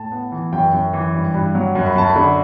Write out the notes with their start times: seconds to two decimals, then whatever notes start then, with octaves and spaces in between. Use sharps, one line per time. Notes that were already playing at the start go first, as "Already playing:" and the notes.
Already playing: A2 A5
0.12 B3
0.32 E3
0.52 F#2 G5
0.73 F#2
0.93 E3
1.14 G2
1.34 G2
1.55 F#3
1.75 F#2
1.86 B5
1.96 F#2 A5
2.10 B5
2.16 D3